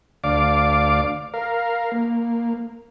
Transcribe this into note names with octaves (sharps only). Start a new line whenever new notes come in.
D2 D5 F5 D6
A#4 F5
A#3